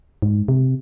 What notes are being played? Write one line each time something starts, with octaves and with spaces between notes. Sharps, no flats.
G#2
C3